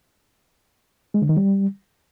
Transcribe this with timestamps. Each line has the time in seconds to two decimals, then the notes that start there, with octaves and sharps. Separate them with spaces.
1.14 G#3
1.22 D3
1.29 D#3
1.37 G3